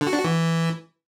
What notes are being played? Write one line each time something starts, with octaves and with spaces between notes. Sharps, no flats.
D3
F#4
D4
F#4
E3